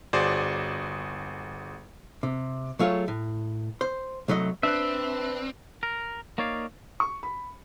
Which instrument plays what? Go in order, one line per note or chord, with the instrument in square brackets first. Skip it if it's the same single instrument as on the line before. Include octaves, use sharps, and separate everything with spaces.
[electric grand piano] G1 F#4 G#4 C5 D5
[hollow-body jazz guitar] C3
F#3 A3 F4 G#4 C#5
A2
C5
C2 F#3 A3 D#5
[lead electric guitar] C4 [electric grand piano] D4 F#6 [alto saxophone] B4 [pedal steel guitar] E5
[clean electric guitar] A#4
A#3 D#4 C#5 D5 F5
[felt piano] C#6
B5